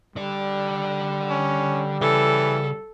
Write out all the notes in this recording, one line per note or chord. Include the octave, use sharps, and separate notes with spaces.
D3 G3 D5
C#4
C#3 E3 A4